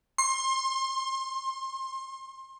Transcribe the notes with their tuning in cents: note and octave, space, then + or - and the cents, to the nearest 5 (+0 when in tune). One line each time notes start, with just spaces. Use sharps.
C6 +30